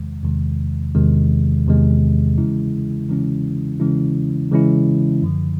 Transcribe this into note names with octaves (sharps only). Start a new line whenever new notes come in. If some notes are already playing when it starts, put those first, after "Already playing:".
Already playing: E2 C3 D#3 G#3
E2 C3 D#3 G#3
E2 C3 D#3 G#3
E2 C3 D#3 G#3
C#3 E3 G#3 C#4 E4
C#3 E3 G#3 C#4 E4
C#3 E3 G#3 C#4 E4
C#3 E3 G#3 C#4 E4
F#2 D3 F3